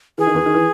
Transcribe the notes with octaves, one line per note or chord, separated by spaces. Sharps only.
E3 G#4
D#3
E2 E3
D#3
E3